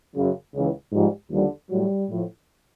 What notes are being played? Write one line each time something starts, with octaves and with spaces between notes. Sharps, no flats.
F#2 C#3 F#3
C#2 C#3 E3
G#2 F3 G3
D#2 D3 F3 G3
A2 F#3 G3
A2 F3